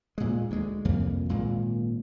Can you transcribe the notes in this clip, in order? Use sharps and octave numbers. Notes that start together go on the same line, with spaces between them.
A#2 G#3
D2 G#3
C2 F2 E3 A#3
G#1 A#2 G#3 A#3